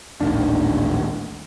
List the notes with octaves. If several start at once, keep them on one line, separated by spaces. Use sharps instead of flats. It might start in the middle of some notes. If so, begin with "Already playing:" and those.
D#1 A1 D#3 D4